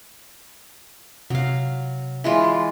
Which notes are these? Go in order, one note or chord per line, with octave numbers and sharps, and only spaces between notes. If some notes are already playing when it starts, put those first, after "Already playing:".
C3 F#3 F5
E3 G#3 F4